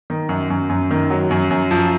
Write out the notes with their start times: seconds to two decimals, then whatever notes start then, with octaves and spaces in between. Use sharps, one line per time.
0.10 D#3
0.29 F#2
0.50 F#2
0.69 F#2
0.91 D#3
1.10 F#3
1.31 F#2
1.51 F#2
1.71 F3